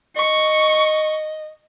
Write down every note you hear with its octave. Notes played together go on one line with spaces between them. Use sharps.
D#5 C#6